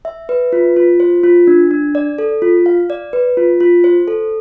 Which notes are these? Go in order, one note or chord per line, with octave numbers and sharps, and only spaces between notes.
E5
B4
F4
F4
C5
F4
D4
D4
D5
A4
F4
F5
D5
B4
F4
F4
C5
A4